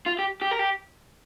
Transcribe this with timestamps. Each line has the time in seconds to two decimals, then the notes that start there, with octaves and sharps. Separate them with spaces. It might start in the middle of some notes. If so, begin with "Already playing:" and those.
0.06 F4
0.19 G4
0.42 G4
0.51 A#4
0.59 G4